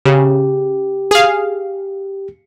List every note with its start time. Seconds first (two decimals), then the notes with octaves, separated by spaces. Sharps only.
0.06 C#3 G4
1.11 G#4 F5